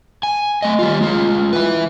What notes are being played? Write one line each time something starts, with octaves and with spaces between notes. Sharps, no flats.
G#5
A3 D#5
G3 F4
G#3 F4
E4 B4